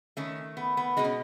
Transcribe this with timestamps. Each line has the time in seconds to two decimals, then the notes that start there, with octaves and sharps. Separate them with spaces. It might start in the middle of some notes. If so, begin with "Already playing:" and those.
0.17 D#3 A3 C#4
0.57 B3
0.77 B3
0.97 B2 G#3 D#4
1.04 C#4